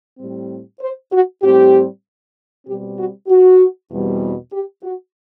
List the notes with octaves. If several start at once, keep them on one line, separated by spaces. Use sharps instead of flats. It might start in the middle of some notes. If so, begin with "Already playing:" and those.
A2 G3 C4
C5
F#4
A2 G3 C4 G4
B2 G3 C4 G4
F#4
F#4
E2 B2 G3 C4
G4
F#4